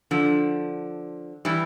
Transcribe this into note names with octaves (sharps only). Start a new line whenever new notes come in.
D3 F3
E3 G3